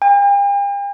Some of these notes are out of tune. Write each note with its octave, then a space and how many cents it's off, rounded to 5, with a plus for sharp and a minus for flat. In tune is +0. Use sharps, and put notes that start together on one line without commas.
G5 +45